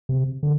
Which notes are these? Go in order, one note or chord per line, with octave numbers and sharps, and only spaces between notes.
C3
D3